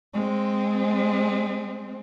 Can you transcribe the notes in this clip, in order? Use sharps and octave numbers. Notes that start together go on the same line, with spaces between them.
G#3 C4